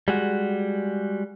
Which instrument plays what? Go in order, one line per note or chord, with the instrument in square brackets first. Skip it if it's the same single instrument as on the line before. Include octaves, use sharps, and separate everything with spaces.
[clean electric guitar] G3 G#3 F#4